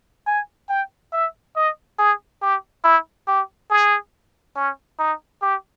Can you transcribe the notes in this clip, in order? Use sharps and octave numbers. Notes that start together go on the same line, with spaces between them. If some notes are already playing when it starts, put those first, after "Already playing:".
G#5
G5
E5
D#5
G#4
G4
E4
G4
G#4
C#4
D#4
G4